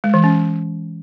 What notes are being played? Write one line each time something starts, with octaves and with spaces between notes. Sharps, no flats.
G#3
E3
C#4